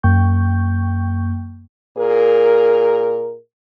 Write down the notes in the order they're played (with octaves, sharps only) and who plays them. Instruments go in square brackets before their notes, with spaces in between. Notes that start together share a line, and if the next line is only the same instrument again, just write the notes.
[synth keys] F#2 A#3 G5 C#6 G6
[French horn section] A#2 G#4 A#4